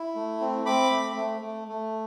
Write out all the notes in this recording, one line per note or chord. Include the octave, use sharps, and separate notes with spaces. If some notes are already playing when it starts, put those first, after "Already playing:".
Already playing: E4
A3
C4
C4 B5 D6
A3
A3
A3
A3